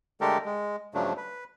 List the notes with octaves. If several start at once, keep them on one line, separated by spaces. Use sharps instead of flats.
D3 G#3 A3 G4 A4 A#4
G#3
G2 C#3 F3 F#3 A3 D4
B4